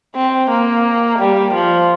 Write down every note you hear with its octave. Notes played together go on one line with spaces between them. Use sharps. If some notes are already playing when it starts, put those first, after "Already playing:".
C4
A#3
G3
F3